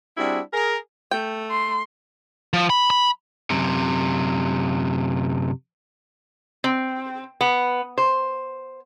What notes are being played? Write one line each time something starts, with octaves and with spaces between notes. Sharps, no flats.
G3 C4 D4 E4 F#4 G#4
G#4 A#4
A3 G5
C6
F3
B5
B5
F#2 C3
C4
B3
C5